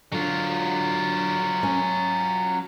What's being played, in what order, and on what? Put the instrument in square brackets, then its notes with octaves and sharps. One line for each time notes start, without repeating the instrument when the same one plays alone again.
[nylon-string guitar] D3 [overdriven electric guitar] F#3 F4
[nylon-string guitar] C#4